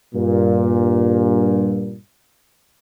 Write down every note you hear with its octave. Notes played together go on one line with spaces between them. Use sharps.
G2 A#2